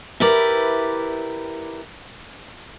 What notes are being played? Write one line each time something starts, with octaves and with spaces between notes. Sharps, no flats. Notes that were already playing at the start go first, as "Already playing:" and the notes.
E4 G4 A#4 B4 D5